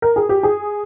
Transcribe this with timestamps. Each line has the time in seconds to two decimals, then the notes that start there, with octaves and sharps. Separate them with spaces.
0.02 A#4
0.16 G#4
0.29 G4
0.43 G#4